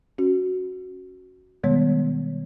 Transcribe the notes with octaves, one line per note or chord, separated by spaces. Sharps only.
C#4 F#4
B2 D#3 G3 G#3 B3 C#5